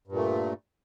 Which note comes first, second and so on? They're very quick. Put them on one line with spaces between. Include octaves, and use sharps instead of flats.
G2 A#2 A3